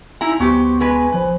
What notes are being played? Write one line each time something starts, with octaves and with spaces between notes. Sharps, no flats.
D#4 E4 G#5 A#5
D2 F#3 B3 G4 C5 C#6
G#3 B4 G#5
A1 F3 B4 C5